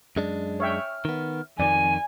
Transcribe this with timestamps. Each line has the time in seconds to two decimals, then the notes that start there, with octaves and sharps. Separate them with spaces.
0.16 F#2 G#3 D4
0.60 C#5 E5 G5 F6
1.05 D#3 B3
1.60 F2 D#3 D5 G#5 D#7